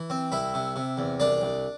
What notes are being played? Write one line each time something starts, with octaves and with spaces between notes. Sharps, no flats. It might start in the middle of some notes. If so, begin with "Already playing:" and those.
Already playing: E3
C4
C2 E4 E5
C3
C3
E2
C2 D4 D5
C2